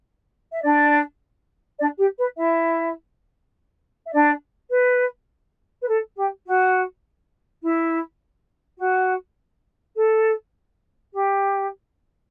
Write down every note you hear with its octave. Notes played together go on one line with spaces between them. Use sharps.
E5
D4 D5
D4 D5
G4
B4
E4 E5
E5
D4 D5
B4
B4
A4
G4
F#4
E4
F#4
A4
G4